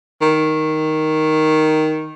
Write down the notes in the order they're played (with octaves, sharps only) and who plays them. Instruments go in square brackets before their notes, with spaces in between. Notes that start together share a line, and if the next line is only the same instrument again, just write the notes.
[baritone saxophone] D#3